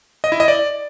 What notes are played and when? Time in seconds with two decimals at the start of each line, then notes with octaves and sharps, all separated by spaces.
0.24 D#5
0.32 E4
0.40 D#5
0.48 D5